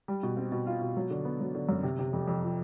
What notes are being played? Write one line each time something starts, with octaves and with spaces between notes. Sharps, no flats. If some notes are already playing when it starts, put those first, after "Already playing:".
G3
B2
C4
B2
F4
B2
F#3
D3
B3
F#3
D3
F#2
C3
C3
F2
F2
F3